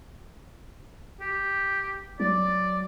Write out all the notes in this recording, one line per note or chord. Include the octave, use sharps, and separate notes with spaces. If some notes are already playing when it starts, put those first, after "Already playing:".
G4
F#3 D5